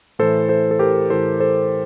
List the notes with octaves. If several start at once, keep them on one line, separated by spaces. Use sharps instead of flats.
A2 E3 A4 C5
A4 C5
A4
G4 A#4
A2 E3 A4 C5
A4 C5